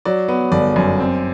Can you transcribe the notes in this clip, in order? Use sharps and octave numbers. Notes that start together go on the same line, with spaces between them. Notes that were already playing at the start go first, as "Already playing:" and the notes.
F#3 D5
B3
G1 D5
F#2
C4